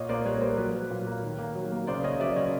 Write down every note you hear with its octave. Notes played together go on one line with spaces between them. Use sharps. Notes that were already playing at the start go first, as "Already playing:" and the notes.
Already playing: A#2 C#5 D#5
A#3 C5 D5
G3 B4 C#5
C#5
G3 A#4 C5
F#3 B4 C#5
F#3
A#2
A#3
D#3
A#3
F#3
A#3
C#3 C5 D5
C#3 C#5 D#5
F#3 D5 E5
C#3 C#5 D#5